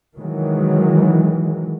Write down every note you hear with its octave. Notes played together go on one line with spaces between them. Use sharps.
D#3 E3 F#3 G#3